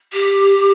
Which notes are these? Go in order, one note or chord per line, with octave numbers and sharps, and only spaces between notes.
G4